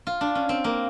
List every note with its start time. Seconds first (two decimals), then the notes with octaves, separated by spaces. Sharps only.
0.07 F4
0.21 D4
0.35 C#4
0.49 C4
0.64 A#3